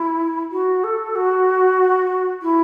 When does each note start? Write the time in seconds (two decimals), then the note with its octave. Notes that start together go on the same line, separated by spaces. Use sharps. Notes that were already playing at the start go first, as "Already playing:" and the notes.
Already playing: E4
0.52 F#4
0.84 A4
1.16 F#4
2.42 E4